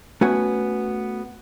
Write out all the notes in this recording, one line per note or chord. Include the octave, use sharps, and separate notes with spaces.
A3 B3 C#4 F#4 G#5